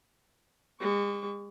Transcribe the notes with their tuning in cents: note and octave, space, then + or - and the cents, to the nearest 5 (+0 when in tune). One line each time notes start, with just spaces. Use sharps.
G#3 -45 C#6 +35